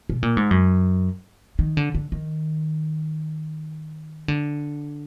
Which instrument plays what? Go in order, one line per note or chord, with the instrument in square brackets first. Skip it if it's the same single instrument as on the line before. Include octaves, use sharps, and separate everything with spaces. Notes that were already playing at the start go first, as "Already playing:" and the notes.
[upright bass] B2
A#2
G#2
F#2
D#3
D3
D3
D#3
D3